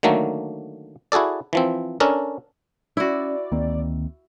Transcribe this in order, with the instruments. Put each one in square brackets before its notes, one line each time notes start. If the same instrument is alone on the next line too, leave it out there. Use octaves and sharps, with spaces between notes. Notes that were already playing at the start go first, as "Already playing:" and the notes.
[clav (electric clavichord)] D3 D#3 F#3 A3 A#3
E4 F#4 G#4 A4 D5
E3 F3 C4
C#4 D4 A4 A#4
[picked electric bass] C#4 D4 [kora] E4 F#4 [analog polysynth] D5
[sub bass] D2 [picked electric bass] D#3 A#3 C4